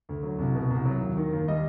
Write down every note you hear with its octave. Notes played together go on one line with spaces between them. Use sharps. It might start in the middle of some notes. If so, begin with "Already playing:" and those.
D2
F#3
C2
B2
C2
F#3
D#2
D#3
D#2
G3 D#5